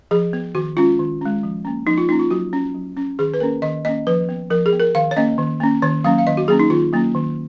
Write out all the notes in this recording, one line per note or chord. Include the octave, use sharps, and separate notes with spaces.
F3 G#4
B3
D#3 F#4
G#3 C#4 F4
D#3
G#3 C#4
F3
A#3 C#4
F3 D#4
F4
A#3 C#4 D#4
F4
F#3 F#4
C#4
F#3
C#4
D#3 G#4
B4
A#3 C#4 A#4
D#3 D#5
A#3 C#4 D#5
F3 B4
B3
F3 A#4
G#4
B3
A#4
D#3 F5
C#5
A#3 C#4 D#5
D#3
A#3 C#4
D#3 C#5
F#3 A#3 C#4 F5
F5
D#3 D#5
F#4
F#3 A#3 C#4 G#4
D#4
D#3 F4
F#3 A#3 C#4
D#3